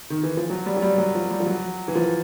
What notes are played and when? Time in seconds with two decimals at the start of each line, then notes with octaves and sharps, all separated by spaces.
0.10 D#3
0.23 E3
0.37 F3
0.50 F#3
0.66 G3
0.77 F#3
0.82 G3
0.98 F#3
1.15 F3
1.31 G3
1.40 F3
1.47 F#3
1.88 E3
1.95 F3